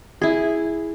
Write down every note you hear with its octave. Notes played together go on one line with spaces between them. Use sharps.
E4 G#4